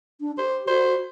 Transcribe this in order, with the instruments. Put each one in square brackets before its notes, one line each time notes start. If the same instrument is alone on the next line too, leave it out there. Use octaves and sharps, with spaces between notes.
[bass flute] D4
[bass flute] G4 [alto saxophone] C5
[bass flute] F#4 [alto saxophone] C5